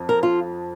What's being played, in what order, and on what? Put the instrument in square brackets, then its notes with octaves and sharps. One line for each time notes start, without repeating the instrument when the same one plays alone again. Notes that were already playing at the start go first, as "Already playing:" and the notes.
Already playing: [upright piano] F2 F3
[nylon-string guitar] A#4
F4